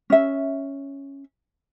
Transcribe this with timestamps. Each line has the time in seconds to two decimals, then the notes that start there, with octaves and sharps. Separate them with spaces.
0.10 C#4 E5